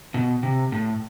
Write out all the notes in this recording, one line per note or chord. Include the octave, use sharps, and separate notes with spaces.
B2
C3
A2